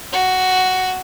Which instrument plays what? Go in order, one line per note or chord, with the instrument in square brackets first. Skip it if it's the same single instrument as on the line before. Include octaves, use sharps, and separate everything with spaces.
[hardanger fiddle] F#4